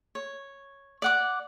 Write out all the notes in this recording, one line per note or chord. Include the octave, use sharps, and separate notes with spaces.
C#5
D5 F#5 D6